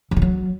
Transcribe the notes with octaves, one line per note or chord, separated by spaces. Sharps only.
E3
D#3
F#3